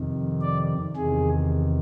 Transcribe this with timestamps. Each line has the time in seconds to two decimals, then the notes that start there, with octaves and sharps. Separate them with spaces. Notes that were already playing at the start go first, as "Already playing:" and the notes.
Already playing: F2 C3 D#3
0.41 D5
0.96 E2 C3 D#3 G#4